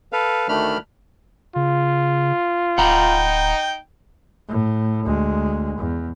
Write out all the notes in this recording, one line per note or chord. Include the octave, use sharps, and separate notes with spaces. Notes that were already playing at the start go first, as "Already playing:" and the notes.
A4 B4 F5
D2 D#3 A3 D4 B5 F6
C#3 F4
D1 D#4 F#5 G5 A#5 B5
A2
D2 G#3
E2